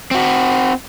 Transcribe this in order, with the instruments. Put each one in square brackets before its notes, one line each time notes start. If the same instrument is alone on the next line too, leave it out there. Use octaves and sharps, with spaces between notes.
[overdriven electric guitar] C4 F#4